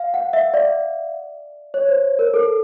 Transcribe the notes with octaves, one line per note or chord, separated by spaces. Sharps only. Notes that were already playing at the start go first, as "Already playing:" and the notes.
Already playing: F5
F#5
E5
D5
C#5
C5
A#4
A4